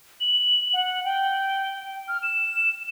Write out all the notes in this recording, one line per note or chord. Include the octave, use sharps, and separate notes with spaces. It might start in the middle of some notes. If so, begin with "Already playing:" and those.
F#7
F#5
G5
F6
E7